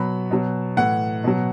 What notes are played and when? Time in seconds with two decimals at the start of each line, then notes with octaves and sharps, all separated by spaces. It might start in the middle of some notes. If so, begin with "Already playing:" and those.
Already playing: B2 F#3 B5
0.31 B2 F#3
0.77 A2 E3 F#5
1.24 B2 F#3